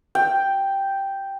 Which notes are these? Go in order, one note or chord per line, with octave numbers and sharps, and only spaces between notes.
G5